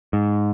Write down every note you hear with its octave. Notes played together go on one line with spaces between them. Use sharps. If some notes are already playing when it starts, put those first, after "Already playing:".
G#2